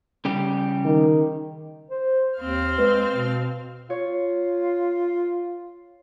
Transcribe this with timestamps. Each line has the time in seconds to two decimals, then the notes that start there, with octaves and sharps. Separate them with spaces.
0.25 C#3 G3 G4
0.85 D#3
1.90 C5
2.39 D#2 C4 F5 F6
2.78 G#3 B4
3.11 B2
3.90 F4 C#5